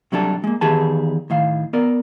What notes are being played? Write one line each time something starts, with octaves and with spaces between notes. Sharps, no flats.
C3 F#3 G3 D4 G4 A4
G#3 A#3
E2 D#3 G4 G#4 B4 A5
A2 D#3 F5
B3 A#4 D5